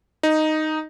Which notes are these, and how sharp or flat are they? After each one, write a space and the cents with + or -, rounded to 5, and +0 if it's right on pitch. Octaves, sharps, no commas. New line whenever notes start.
D#4 -5